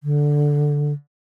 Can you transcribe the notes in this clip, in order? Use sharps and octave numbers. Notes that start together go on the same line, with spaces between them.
D3